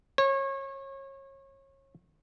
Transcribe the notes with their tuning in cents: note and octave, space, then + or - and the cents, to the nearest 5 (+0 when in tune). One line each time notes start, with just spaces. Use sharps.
C#5 -30